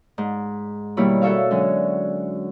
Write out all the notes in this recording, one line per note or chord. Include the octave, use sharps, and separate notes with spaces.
G#2
B2 D#3 G3 A#3 E4 C#5
F#4 A4 C#5 E5 F5
D3 F#3 G#3 C#4